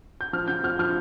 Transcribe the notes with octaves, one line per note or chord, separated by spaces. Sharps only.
G6
F3 F6
C#3 G6
F2 F6
F3 F6